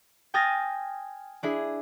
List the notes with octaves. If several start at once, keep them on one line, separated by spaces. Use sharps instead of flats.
G5 G#5 D#6 F6 A6 A#6
D4 E4 G#4